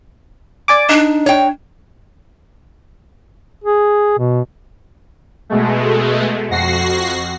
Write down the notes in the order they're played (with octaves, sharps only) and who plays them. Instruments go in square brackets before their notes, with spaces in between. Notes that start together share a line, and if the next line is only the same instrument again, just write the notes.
[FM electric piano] D5 G#5 D6
[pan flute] D4 [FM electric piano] D#4
[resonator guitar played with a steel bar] C#5 G5
[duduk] G#4
B2
[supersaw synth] B2 G#3 A3
F2 F#4 A#6 C7